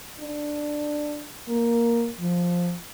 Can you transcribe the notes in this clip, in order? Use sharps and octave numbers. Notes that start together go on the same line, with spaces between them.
D4
A#3
F3